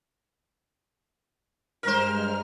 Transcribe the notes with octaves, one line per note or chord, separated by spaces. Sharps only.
G2 G#3 A#4 C5 F6